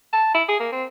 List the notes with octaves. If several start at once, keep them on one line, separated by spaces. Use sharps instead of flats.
A5
E4
G#4
A#3
C4